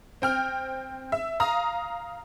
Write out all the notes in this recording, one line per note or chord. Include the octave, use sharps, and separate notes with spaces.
C4 G5 F6
E5
F5 A#5 D#6